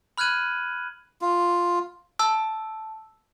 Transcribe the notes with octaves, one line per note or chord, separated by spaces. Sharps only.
B5 F6 F#6 G#6 D#7 F#7
F4
A5 E6